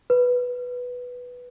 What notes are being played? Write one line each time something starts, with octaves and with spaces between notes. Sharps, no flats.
B4